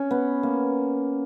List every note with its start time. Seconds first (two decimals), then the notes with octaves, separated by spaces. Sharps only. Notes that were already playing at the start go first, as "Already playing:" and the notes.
Already playing: C#4
0.11 B3
0.43 A#3